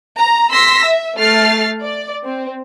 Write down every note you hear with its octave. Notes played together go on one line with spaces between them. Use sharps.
A#5
C6 E6 A#6 B6
E5
A3 F6 A6 C7
D5
C4